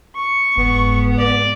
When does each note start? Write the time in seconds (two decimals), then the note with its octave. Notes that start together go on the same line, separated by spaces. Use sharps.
0.16 C#6
0.57 F#1 G#2 B3
1.19 D5